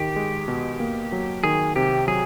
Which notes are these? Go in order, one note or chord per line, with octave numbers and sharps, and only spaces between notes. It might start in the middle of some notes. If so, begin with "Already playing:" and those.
Already playing: D#3 G4
G#3
B2
A#3
F#3
D#3 G#4
C3 G4
F#3 G#4